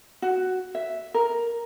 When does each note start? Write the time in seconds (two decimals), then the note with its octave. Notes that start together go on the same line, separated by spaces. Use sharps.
0.22 F#4
0.75 E5
1.14 A#4